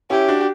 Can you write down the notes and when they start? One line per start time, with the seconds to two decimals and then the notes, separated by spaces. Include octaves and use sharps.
0.10 C#4 E4 G4
0.28 D4 F#4